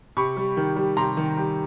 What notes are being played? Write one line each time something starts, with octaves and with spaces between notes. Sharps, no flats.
C3 B5 C#6
G3
D#3
G3
C3 A#5 C6
D#3
G3